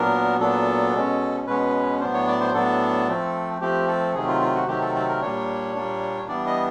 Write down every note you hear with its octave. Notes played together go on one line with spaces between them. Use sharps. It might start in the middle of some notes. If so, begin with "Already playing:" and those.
Already playing: A#2 F#3 B3 D4 A#4
A#2 F#3 B3 D4 A4
B2 G#3 C#4
B2 G#3 C#4 B4
A2 F#3 B3 D4 C5
C#5
D5
C5
A2 F#3 B3 D4 A4
F3 A3 C4
F3 A3 C4 G4
A4
C3 D#3 F#3 A3 C4 G#4
F4
F4
F#4
C3 D#3 F#3 A3 C4 G4
A4
A4
A#4
A#2 G3 A#3 D4 C#5
A#2 G3 A#3 D4
E3 G3 B3 D4 D5
D#5